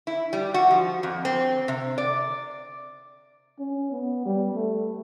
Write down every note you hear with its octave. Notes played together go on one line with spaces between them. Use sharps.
E4
G3
F#4
F3
F2
C4
C3
D5
C#4
B3
G3
A3